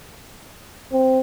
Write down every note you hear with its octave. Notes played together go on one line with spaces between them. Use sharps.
C4